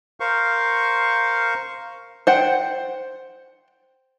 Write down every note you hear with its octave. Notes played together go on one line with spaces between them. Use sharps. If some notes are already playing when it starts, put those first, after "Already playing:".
A#4 C5 F5 C#6
C5 F#5 G5